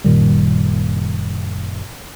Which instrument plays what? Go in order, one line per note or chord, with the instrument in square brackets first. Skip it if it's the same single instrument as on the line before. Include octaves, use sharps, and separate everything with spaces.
[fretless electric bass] F#1 A#2 D#3 G3